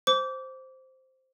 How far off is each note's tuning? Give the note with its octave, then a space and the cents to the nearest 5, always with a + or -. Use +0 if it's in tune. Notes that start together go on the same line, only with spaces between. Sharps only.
C5 +0 D6 -25